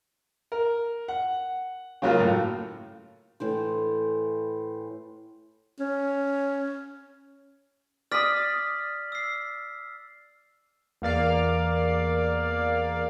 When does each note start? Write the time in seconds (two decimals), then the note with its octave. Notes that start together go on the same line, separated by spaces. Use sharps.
0.52 A#4
1.08 F#5
2.02 C#3 F#3 A#3 F4
2.20 A2
3.40 A2 E3 C5
5.80 C#4
8.11 D5 D#6 F6 B6
9.12 E6 C7
11.02 E2 A#3 D5 F5